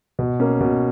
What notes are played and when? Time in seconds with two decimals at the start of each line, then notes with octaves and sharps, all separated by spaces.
0.19 B2
0.40 A#3 C#4
0.60 B2